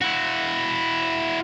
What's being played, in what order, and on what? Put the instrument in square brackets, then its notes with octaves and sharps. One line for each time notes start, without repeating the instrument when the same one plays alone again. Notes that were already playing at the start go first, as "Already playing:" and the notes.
[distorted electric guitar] E4 F#4